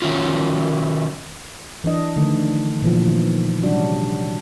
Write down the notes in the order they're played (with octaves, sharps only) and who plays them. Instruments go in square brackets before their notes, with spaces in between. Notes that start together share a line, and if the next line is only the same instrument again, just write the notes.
[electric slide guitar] D#3 F#3 C#4 E4 F4
[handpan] E3 F#3 D4 D#5
D3 D#3 F3 A3
A#2 E3 F3
D#3
C3 F#3 G3 C#4 D4 F#4